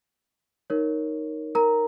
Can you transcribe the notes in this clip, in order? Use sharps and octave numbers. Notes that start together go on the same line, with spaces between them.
D#4 A#4 C#5
A#4 A#5